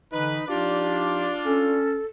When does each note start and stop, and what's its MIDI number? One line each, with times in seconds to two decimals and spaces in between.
0.13 0.39 50
0.13 0.39 52
0.13 0.46 63
0.13 0.46 71
0.48 1.32 53
0.48 1.81 62
0.48 1.32 63
0.48 1.81 65
0.48 1.32 67
0.48 1.81 74
1.45 1.98 61
1.45 2.06 69